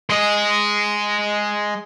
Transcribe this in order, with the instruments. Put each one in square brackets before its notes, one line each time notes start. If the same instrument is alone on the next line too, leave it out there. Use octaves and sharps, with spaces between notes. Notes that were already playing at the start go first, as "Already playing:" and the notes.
[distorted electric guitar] G#3 D#5